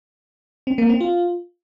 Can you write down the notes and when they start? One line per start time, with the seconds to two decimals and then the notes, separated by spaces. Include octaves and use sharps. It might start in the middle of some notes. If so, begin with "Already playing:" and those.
0.67 C4
0.78 A#3
0.89 C4
1.01 F4